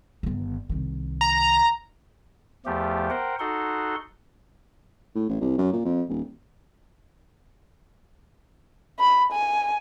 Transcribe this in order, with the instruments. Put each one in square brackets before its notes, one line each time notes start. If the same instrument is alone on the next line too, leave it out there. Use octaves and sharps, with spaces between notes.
[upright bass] G1 D#3
C2 D#3
[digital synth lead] A#5
[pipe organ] E2 F3 A3 G4
A#4 C5 F#5 G5
D#4 F#4 A4 F#5 C6
[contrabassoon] A2
A1
C2
F#2
A#2
F2
D#1
[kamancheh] B5
G#5